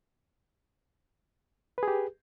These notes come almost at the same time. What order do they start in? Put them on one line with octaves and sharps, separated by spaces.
B4 G#4 G4